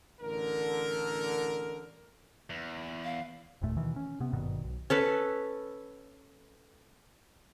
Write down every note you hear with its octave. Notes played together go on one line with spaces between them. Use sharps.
A1 D3 A#4
E2
F5
F#1 D#2 A#2 A3
B2 D#3 E3
C#4
C3 B3
G#1 G2 B2 D#3
B1
C#4 A4 B4